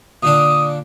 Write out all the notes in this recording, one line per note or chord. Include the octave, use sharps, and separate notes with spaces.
A#2 D3 D4 D#6